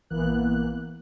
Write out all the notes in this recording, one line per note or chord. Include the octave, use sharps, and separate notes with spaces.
A#1 E3 A#3 B3 F#6